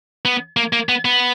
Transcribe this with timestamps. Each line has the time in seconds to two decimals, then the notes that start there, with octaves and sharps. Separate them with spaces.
0.25 B3
0.57 A#3
0.73 A#3
0.89 B3
1.05 B3